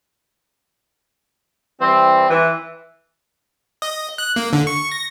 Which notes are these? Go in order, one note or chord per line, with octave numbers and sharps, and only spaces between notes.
E3 G3 C4
E3
D#5
F#6
A#3
D3
C#6
A#6